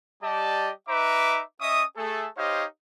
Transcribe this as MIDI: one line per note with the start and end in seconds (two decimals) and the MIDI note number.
0.23 0.71 55
0.23 0.71 67
0.23 0.71 74
0.23 0.71 75
0.23 0.71 81
0.89 1.42 63
0.89 1.42 71
0.89 1.42 76
0.89 1.42 82
0.89 1.42 86
1.61 1.84 61
1.61 1.84 75
1.61 1.84 76
1.61 1.84 85
1.61 1.84 87
1.97 2.28 57
1.97 2.28 68
1.97 2.28 69
2.37 2.65 63
2.37 2.65 67
2.37 2.65 72
2.37 2.65 73
2.37 2.65 75
2.37 2.65 77